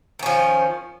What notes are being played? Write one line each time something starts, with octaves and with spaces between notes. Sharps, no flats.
D#3 F3 C#4